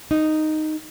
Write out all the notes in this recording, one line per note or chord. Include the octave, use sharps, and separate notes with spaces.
D#4